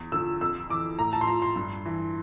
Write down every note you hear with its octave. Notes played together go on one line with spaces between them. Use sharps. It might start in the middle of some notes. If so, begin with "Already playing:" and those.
Already playing: E2
D3 F3 E6
F2 E6
E3 D6
A2 A#5
A5
C6
F3 A#5
C6
G2
E3